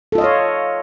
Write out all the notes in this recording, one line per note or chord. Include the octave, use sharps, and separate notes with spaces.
F4 A4 C#5 D#5 F5